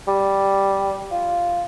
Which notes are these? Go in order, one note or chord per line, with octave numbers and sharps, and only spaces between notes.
G3
F4